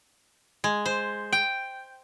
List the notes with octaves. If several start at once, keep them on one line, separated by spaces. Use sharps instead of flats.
G#3
C5
G5